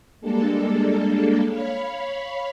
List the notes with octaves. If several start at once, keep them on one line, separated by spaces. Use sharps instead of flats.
G3 G#3 A#3 D4 A4
C#5 F5 B5